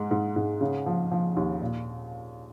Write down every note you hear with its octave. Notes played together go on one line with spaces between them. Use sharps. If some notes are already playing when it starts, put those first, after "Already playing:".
Already playing: G#2 G#3
G#2
G#2
C#3
F3
F3
D#2
A#2